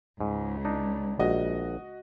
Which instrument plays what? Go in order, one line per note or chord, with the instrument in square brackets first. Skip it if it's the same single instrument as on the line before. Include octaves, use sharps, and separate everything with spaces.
[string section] C#2 [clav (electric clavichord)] G#2
[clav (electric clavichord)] D4 D#4
[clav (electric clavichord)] A#1 [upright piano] F#4 D#5